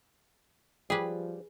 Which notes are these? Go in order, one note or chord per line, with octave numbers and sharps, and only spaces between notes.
F3 G3 G#4 B4